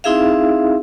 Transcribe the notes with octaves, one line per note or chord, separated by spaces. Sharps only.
C4 D#4 E4 G#4 E5 F5